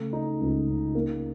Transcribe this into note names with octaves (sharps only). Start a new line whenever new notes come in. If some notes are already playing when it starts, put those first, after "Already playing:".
Already playing: C#3 A3
D#4
C#2
C#3
A#3